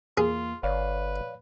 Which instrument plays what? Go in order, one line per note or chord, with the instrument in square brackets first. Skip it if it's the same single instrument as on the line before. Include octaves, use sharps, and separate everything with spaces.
[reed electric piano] E2 A#3 [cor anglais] F4 [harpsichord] G#4
[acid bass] G1 [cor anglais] B4 [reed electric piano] C#5 D5 F5